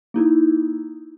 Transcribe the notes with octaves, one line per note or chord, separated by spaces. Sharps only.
A#3 D#4 E4